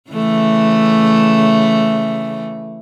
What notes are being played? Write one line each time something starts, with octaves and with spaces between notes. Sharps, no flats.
C#3 E3 A3